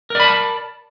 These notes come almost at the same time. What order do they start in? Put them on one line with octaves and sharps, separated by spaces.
A#4 D5 B5 A5